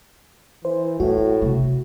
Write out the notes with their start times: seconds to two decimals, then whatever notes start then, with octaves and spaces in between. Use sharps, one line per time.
0.65 E3 C5
1.00 A2 G#3 F#4
1.42 C3 A3